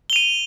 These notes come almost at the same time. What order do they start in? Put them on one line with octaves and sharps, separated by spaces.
G7 F7 D#7